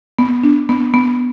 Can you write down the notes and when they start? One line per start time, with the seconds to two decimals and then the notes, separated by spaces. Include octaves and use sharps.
0.19 B3
0.44 D4
0.69 B3
0.94 B3